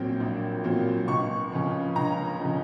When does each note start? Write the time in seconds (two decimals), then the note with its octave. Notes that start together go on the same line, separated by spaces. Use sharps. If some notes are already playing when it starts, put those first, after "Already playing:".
Already playing: A#1 A#2 F#3 C4
0.20 A#1
0.64 A#2 F#3 C4
1.08 C#2 C#6
1.52 C#3 F3
1.95 C#2 A#5
2.40 C#3 F3